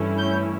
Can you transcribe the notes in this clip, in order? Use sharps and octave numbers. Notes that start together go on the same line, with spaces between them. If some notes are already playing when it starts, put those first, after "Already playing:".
Already playing: G2 E3 A3 C#4 E4
G6